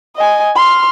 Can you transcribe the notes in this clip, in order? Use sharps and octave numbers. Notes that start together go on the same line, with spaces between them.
D#5 G#5
C6 F6